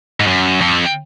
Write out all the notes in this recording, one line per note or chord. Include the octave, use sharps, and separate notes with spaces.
G#2
F#2
F2